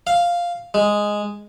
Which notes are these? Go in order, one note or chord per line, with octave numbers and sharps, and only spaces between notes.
F5
G#3